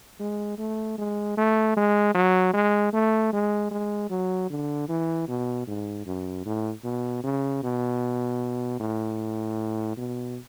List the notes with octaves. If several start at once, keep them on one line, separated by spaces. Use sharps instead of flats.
G#3
A3
G#3
A3
G#3
F#3
G#3
A3
G#3
G#3
F#3
D3
E3
B2
G#2
F#2
A2
B2
C#3
B2
A2
B2